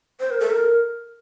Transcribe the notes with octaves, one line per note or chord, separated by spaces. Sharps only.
C5
A#4
A4
A#4